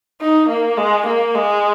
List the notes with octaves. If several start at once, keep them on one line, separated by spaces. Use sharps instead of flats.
D#4
A#3
G#3
A#3
G#3